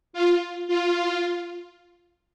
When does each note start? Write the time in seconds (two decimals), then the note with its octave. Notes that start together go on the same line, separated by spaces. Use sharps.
0.13 F4
0.68 F4